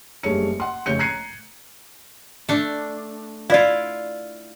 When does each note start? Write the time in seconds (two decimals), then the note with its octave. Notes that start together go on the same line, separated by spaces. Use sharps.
0.23 F#1 G2 G#3 A3 C#5 C#7
0.60 F#5 C6
0.86 F1 C#3 C#5 G6 C#7
0.99 A#5 F#6 G#6 C7 C#7 D#7
2.49 A3 D4
3.50 E4 F4 D5 F5